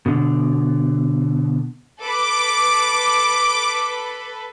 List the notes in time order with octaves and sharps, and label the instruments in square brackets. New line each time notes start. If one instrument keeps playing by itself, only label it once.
[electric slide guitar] B2 D3
[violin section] A4 B4 [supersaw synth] D6